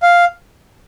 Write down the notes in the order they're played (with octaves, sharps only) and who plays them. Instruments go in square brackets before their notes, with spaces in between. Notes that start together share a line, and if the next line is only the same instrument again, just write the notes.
[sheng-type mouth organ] F5